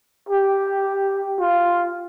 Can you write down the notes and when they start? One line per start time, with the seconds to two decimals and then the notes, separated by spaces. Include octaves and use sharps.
0.29 G4
1.40 F4